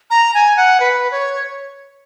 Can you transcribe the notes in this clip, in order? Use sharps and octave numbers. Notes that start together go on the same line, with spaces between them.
A#5
G#5
F#5
B4
C#5